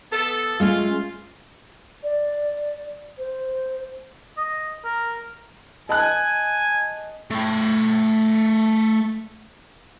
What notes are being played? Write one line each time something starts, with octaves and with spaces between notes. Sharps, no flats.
B3 A4
G#3 A3 C#4 F4
D5
C5
D#5
A#4
D#5 G#5 A5 F#6
A3 G5